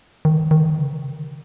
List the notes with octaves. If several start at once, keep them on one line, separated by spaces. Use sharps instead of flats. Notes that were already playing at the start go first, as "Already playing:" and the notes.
D#3
D#3
C#3
C3